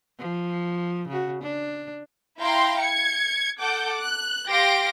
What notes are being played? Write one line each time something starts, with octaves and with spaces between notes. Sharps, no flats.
F3
C#3 F#4
D4
E4 F5 G5 A#5 C6
G#6 C#7
A4 F#5 D6 G6
F#6
G4 F5 C6 A#6 D7